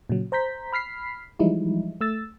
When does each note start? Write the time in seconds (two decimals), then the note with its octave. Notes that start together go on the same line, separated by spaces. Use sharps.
0.10 A#2 C#3 F#3
0.32 C5 A#5 G6 B6
0.73 B5 F6 B6 C7
1.39 E3 F3 G3 G#3 D#4 E4
2.01 A3 E6 A6